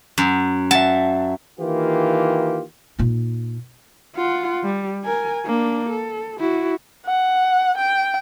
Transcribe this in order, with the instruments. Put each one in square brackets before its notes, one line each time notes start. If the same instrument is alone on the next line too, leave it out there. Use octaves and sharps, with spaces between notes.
[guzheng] F#2
[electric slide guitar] E5 F#5 [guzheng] A5
[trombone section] D#3 E3 A#3 F4 G4
[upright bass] A#2 D#4
[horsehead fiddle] F4 F#5
G3
A#4 G#5
A#3 D4
A4
E4 F#4
[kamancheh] F#5
G5